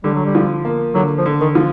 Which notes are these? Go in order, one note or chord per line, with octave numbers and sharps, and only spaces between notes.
D3 G3
F#3
G3
F3
A#3
D3 F#3
F3
D3
D#3
F3